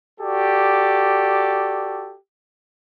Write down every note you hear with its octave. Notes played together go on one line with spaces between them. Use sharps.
F#4 G4 A4 D5